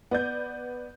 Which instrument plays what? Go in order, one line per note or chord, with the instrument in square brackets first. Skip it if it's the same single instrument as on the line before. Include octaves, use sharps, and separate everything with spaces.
[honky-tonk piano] B3 D5 G6